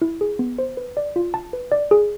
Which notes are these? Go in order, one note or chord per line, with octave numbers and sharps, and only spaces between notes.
E4
G#4
B3
C5
B4
D5
F4
A5
B4
D5
G#4